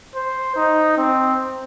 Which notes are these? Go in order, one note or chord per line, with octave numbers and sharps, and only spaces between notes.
C5
D#4
C4